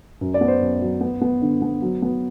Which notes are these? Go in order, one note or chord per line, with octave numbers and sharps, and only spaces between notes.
F#2
D5
B3
C5
F#2
F#3
B3
B3
D3
B3
F#3
B3